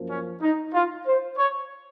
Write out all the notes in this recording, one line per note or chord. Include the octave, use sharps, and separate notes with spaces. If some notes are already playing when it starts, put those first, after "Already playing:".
Already playing: F#2 F3 A#3
C#4
D#4
F4
C5
C#5